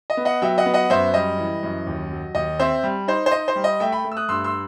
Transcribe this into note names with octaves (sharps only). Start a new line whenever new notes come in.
D#5
B3
D#5 F#5
F#3 E5 G5
D#5 F#5
B3
D#5 F#5
F#2 C5 E5
G3 D#5
E3
F#2
D#2
F#3
D#2 D#5
C4 C5 E5
G3
D#4 C5
C5
D#4 D#5
C5
G3
D#5
A3 E5 G5
G5 B5
A3
E6
D#6 F#6
G2 C6 E6
C6 E6